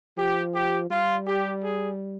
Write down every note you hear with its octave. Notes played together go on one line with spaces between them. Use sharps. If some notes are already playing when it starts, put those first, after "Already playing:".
F3 G4
G4
G3 F4
G4
G#4